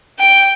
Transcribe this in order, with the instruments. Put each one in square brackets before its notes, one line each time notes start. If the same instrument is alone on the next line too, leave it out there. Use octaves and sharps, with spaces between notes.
[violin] G5